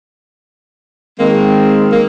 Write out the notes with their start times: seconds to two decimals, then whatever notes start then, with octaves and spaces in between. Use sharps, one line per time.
1.20 D#3 G#3 A#3 C4
1.92 A#3